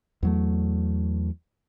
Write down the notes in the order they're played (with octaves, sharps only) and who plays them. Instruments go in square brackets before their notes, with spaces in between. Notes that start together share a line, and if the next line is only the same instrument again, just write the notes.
[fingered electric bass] E2 F#3 A3